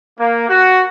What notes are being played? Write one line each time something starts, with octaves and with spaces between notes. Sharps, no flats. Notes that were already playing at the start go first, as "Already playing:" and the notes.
A#3
F#4